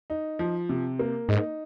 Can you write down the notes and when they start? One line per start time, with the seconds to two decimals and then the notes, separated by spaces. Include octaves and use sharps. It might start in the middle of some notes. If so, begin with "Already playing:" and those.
0.10 D#4
0.39 F3
0.69 C3
0.99 A#3
1.29 G#2 D#4